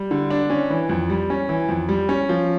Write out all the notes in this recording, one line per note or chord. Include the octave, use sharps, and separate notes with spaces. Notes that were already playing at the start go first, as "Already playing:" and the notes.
Already playing: G3
D3
D4
C#4
E3
F2
G3
C#4
E3
F2
G3
C#4
F3